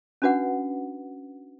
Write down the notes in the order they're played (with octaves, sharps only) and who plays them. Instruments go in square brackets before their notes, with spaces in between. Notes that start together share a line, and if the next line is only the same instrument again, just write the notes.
[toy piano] C#4 D4 F#4 B4 F#5